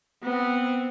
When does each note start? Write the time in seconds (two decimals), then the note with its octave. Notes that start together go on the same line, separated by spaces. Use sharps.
0.23 B3 C4